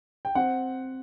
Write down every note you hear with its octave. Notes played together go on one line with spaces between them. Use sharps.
G5
C4 F#5